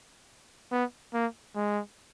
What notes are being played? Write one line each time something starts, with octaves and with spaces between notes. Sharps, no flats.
B3
A#3
G#3